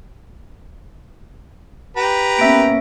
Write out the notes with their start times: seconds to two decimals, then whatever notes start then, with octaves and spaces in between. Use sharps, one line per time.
1.97 G4 B4 A#5
2.39 A#3 B3 C#4 E5 A#6 D7